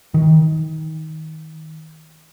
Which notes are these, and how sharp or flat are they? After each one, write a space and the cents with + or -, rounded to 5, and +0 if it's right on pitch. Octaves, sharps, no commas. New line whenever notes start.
D#3 +25